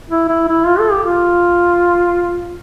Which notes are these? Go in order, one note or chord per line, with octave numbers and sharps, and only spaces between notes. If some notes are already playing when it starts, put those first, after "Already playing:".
E4
E4
E4
F4
A4
G4
F4